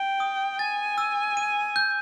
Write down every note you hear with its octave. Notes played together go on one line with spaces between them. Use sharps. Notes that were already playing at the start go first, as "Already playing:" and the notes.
Already playing: G5
D#6
G#5 A6
E6
D#7
G6